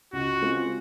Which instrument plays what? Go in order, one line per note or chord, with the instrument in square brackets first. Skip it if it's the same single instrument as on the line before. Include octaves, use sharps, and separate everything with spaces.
[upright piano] C#2 [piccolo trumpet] F#4
[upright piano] C#3 G#3 C4 F4